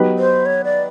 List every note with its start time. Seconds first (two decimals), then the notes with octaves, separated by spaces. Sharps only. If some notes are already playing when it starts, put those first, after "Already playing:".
Already playing: F#3 B3 D#4 G4 B4
0.18 C5
0.46 C#5
0.64 D5